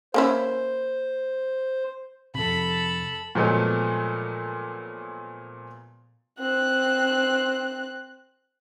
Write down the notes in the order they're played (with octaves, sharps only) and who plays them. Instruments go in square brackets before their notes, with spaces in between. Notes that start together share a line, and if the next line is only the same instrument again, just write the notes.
[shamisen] A#3 C#4 E4 [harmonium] C5
[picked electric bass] F2 C3 [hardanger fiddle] A4 B5
[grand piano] A#2 F3 F#3 G#3 A3 B3
[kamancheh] C4 F#6